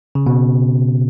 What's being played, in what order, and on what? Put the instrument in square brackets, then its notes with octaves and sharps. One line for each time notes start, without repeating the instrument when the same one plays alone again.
[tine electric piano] C#3
B2